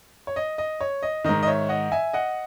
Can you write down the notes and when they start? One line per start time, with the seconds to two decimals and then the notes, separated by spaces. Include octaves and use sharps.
0.27 C#5
0.36 D#5
0.58 D#5
0.81 C#5
1.03 D#5
1.24 G#2 D#3 D#5
1.43 D#5
1.47 C#5 E5
1.69 D#5 F#5
1.92 E5 G#5
2.13 D#5 F#5